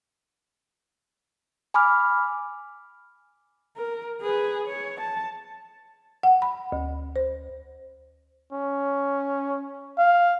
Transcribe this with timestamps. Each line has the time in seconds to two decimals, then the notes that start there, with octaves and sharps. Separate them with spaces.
1.74 G#5 B5 D6 F6
3.77 A#4
4.21 G#4 B4
4.67 C#5
5.01 A5
6.23 F#5
6.42 B5
6.72 D2
7.16 C5
8.52 C#4
9.98 F5